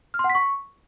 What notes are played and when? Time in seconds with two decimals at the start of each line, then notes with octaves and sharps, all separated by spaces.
0.14 F6
0.19 C6
0.24 F#5
0.30 B6
0.35 C#6